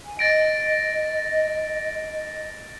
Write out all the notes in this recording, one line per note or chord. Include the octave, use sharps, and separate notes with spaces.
G#5
D#5 A6 A#6 D7